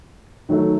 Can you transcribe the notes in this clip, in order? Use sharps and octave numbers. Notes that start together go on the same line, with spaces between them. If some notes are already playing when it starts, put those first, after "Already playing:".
D#3 F#3 A3